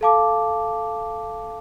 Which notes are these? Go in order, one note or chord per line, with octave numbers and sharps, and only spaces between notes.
A4 F5 A5 D6